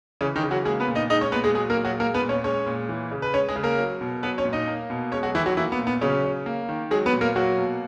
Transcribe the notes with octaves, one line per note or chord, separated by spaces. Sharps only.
C#3 E3 C#4
D#3 D#4
C#3
F#3 F#4
G#3 A#3 G#4
B3 B4
A#2
D#4 D#5
G#3 D#4 D#5
C#4 C#5
A#2 B3 B4
G#3 G#4
F#3 G#3 G#4
A#3 A#4
A#2
F#3 F#4
G#3 A#3 A#4
B3 B4
A#2
C#4 C#5
G#3 C#4 C#5
A#2
E3
C#3
B4
G#3 C#4 C#5
G#3 G#4
C#3
A#3 A#4
F#3
B2
F#3 B3 B4
C#4 C#5
A#2
D#4 D#5
A#3
B2
G#3 C#4 C#5
F#3 F#4
D#3 E3 E4
F#3 F#4
E3 A#3 E4
B3
A#2
B3
C#3 F#3 C#4
C#3
A#3
D#3
F#3 G#3 G#4
B3 B4
A#2
A#3 A#4
F#3 A#3 F#4
B2